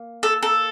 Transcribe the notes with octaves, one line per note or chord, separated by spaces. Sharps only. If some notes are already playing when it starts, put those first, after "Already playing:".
Already playing: A#3
A4
A4